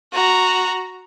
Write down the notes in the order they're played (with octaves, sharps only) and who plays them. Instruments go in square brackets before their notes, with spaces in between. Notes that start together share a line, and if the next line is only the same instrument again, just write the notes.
[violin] F#4 A#5